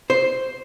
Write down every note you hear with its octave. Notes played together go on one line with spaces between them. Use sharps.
C5